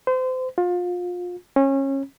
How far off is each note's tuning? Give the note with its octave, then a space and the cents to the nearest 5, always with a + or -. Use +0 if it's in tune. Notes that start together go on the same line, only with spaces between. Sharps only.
C5 -30
F4 +30
C#4 -25